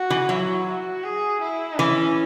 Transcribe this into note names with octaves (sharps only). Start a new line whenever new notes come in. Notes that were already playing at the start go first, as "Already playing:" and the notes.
Already playing: F#4
E3
F#3 E4
F#4
G#4
E4
E3 C#4